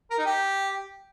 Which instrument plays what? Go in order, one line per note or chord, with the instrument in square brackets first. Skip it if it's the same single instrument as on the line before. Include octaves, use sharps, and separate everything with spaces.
[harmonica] A#4
D#4
G4